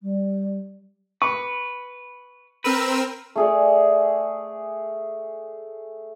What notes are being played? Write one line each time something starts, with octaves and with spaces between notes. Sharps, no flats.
G3
B4 C#6
C4 A#4 B4 E6
A3 G#4 D5